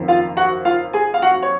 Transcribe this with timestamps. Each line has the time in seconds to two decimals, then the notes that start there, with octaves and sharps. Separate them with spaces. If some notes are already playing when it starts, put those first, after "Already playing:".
Already playing: F#1 F2 D#3
0.08 F4 F5
0.37 F#4 F#5
0.65 F4 F5
0.93 G#4 G#5
1.14 F5
1.22 F#4 F#5
1.43 C#5